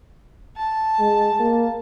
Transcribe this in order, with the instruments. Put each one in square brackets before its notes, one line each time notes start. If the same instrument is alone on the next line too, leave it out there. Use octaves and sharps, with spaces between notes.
[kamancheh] A5
[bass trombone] G#3
A#3